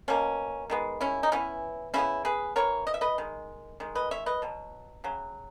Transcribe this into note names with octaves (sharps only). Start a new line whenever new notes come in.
B2 A#3 C#4
D#3 G#3 B3
C#4 E4
D#4
E3 B3 C#4 E4
C#3 G#3 B3 C#4 E4
G#4 B4
E3 B3 A#4 C#5
D#5
E5
B4 D#5
D#3 G#3
D#3 G#3
B4 D#5
C#5 E5
B4 D#5
B2 F#3
C#3 F#3